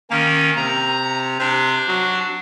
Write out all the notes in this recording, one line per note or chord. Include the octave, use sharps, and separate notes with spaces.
D#3 A#3 C#4
C3 A#5
C3 D4
F#3